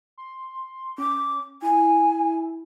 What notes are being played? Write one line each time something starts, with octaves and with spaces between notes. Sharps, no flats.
C6
C#4 D6
E4 G#5